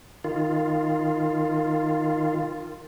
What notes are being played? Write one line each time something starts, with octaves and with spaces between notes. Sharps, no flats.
D#3 F4